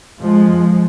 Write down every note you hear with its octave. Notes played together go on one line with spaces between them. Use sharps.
F2 F3 G#3
F2